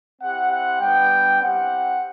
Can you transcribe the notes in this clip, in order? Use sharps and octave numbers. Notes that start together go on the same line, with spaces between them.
C4 E4 G4 F#5
F#5
G3 B3 D4 G5
C4 E4 G4 F#5